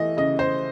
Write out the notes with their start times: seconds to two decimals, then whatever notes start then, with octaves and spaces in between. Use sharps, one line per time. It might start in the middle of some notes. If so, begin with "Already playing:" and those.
Already playing: E3 A3 D#5
0.17 C#3 D#5
0.39 C5